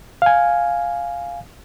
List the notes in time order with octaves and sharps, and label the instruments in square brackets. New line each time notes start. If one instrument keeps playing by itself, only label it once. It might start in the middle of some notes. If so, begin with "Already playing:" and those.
[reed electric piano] F5 G#5